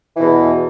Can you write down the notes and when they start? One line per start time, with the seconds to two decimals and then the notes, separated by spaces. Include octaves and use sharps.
0.15 E3
0.18 B2
0.21 E2